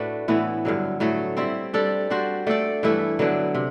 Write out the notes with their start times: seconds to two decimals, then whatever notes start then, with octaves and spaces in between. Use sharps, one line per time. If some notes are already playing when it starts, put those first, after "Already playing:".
Already playing: A2 A3 D4 F#4 B4
0.28 A2 E3 B3 E4
0.65 G2 D3 F#3
1.00 A2 F#3 A3
1.37 G3 C4 E4
1.73 G3 D4 A4
2.10 G3 D4 F#4 C5
2.47 A3 D4 A4 D5
2.83 G2 E3 A3 E4
3.19 D3 F#3 B3 D4
3.55 C3